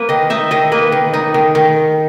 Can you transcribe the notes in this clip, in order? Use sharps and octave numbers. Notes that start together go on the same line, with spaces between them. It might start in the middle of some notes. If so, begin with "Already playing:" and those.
Already playing: A#3 B4
D#3 D#5
D#4 E5
D#3 D#5
A#3 B4
D#3
D#4
D#3
D#3